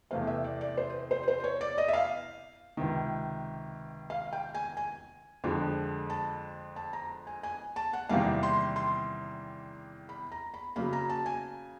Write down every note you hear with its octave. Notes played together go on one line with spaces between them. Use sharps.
E2 C3 E3 A3 C4 F5
E5
D5
D5
C5
C5
C5
C#5
D5
D#5
E5
F5
C#2 C3 D#3
F5
G5
G#5
G#5
F2 D3 F3 G#3
A5
A5
A#5
G#5
G#5
A5
F#5
E2 C3 D#3 G3 A#3 F5
C6
C6
B5
A#5
B5
C#3 F#3 A#3 B5
A#5
A5
G#5